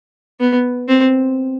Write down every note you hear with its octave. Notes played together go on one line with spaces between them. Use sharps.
B3
C4